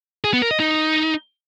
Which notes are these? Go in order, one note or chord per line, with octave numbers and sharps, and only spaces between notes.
G#4
B3
A#4
D#5
D#4